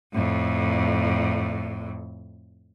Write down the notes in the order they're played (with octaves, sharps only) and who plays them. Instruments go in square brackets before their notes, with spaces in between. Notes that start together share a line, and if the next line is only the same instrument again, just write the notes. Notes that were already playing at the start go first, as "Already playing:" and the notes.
[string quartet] F2 A2